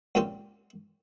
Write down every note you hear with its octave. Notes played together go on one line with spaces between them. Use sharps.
C#2 A#2 C4 C#4 G4